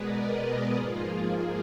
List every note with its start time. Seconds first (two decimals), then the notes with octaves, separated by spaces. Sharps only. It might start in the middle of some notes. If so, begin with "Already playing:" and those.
Already playing: B2 G#3 B3 G#4 A#4 B4 D5
0.14 B4 D#5
0.43 G#4 B4
0.73 G#2 F3 A#3 F4 G#4